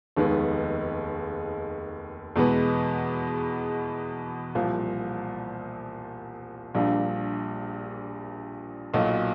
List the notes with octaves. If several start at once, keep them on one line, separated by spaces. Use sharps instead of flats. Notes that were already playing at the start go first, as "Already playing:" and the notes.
F1 D#2 D#3 G#3 B3
E2 B2 G#3 B3
C2 A#2 F3
A#1 A#2 G3 A#3 D4
B1 A#2 F#3